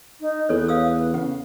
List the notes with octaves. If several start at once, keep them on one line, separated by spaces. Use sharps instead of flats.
D#4
E2 A4 B4 C#5
F5 D#6 E6
C#3 F#5